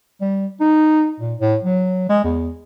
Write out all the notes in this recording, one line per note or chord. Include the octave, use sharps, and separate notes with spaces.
G3
D#4
A#2
A2
F#3
G#3
E2